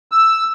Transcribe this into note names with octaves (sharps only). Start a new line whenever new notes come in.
E6